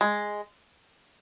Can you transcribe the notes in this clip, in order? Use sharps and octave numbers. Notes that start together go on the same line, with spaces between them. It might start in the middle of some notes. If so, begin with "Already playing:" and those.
G#3